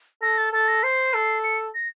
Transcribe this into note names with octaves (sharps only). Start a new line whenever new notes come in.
A4 A#6
A6
A4 A6
A#6
C5 C7
A4
C#7
A#6